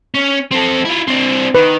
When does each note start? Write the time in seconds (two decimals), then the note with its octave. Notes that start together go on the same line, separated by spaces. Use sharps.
0.15 C#4
0.52 C4 A4
0.85 E4 F4
1.08 C4 D4
1.55 D#3 B4